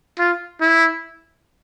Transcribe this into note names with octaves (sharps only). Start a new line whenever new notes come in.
F4
E4